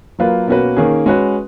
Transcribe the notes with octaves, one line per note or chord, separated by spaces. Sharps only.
F#3 A#3 F4 B4
B2 A#3 C#4 F#4 B4
D#3 A#3 C#4 G#4
G#3 C#4 F#4 B4